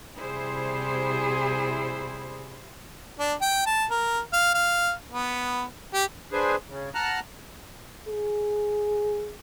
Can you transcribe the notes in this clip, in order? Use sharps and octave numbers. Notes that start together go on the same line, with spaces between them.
C3 G3 E4 G#4 C5
D4
G5
A5
A#4
F5
F5
B3
G4
D4 G#4 B4 C5
C#3
F#5 A5 A#5 F6 F#6
G#4